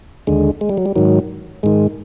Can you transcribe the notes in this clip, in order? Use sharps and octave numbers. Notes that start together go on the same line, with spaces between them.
D#2 D3 G#3
G#3
G3
F#3
G3
G#2 D#3 F#3
G#2 D#3 G#3